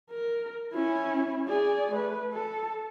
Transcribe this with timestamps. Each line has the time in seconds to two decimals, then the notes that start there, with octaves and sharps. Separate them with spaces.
0.10 A#4
0.73 C#4 E4
1.48 G#4 D5
1.91 A3 B4
2.33 A4